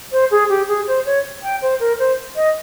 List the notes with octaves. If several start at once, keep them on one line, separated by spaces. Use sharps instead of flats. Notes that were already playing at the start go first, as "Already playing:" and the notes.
C5
G#4
G4
G#4
C5
C#5
G5
C5
A#4
C5
D#5